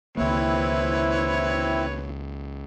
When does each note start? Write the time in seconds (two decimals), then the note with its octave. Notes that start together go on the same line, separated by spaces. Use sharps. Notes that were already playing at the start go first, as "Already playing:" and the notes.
0.17 C#2 D#3 A#3 C4 E4 B4 C#5